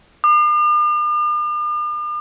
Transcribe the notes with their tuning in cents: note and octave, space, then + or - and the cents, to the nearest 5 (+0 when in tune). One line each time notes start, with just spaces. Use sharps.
D6 +45